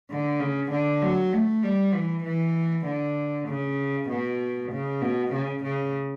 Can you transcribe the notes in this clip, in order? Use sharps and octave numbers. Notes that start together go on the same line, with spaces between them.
D3
C#3
D3
F#3
A3
G3
E3
E3
D3
C#3
B2
C#3
B2
C#3
C#3